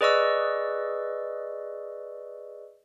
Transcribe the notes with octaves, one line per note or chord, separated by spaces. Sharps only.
G#4 B4 D5 D#5 C#6 E6